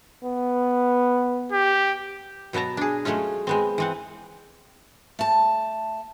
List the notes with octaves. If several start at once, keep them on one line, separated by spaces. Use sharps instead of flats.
B3
G4
B2 F#3 B3 A5 A#5
D4 G#4
F#3 G#3 A3 C#4 F4
G#3 B3 C4
E3 C4 F#5
A3 A5